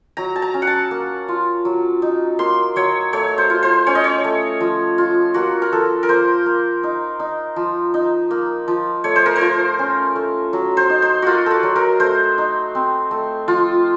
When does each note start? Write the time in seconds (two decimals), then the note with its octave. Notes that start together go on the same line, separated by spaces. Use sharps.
0.17 F#3 A#5
0.36 A5
0.42 A#5
0.54 C#4
0.62 F#5
0.67 A5
0.91 A#3
1.29 F4
1.65 F#3
2.02 D#4
2.39 A#3 C6
2.76 F#3 C#5
3.13 A3 C#5
3.38 C5
3.50 F4
3.63 C5
3.87 C#4 C#5
3.95 D#5
4.04 C#5
4.24 A3
4.60 F3
4.98 F4
5.34 A#3 F#4
5.62 A#4
5.72 F3 A4
6.03 A#4
6.09 A#3 C5
6.46 A#3
6.83 D#4
7.20 D#4
7.56 F3
7.94 D#4
8.31 A#3
8.68 F3
9.04 A3 C#5
9.16 C5
9.26 A#4
9.36 C5
9.41 F4
9.79 C#4
10.16 A3
10.53 F#3
10.77 C5
10.90 D#4
11.02 C5
11.22 A#3 F4 F#4
11.46 F#4 A4
11.63 F#3
11.76 A#4
12.00 A3 C5
12.38 D#4
12.75 C4
13.11 A3
13.48 F3 F4